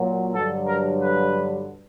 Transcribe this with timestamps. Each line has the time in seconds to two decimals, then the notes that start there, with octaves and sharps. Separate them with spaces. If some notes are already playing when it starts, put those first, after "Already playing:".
Already playing: A#2 F#3
0.34 G2 D3 F#3 A4
0.67 A#4
1.01 B4